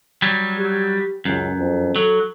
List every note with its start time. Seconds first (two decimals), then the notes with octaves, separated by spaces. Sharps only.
0.22 F#3 G3
0.58 G4
1.25 C#2 F#2
1.59 F2
1.96 F#3 A4